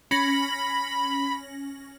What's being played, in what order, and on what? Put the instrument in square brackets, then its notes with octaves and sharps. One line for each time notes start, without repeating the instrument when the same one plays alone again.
[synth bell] C#4 A#6 F#7 [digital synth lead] B5